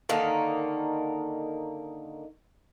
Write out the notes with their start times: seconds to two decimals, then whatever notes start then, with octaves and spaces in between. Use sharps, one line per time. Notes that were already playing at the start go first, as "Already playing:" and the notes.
0.09 D3 D#3 A#3 D#4